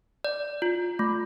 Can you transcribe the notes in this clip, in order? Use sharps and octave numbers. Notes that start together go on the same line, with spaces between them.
D5
F4
A3